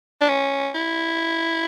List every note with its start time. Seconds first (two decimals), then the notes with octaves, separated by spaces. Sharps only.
0.21 D4
0.29 C#4
0.75 E4